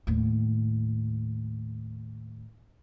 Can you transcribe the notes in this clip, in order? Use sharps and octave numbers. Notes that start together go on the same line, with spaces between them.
D#2 A2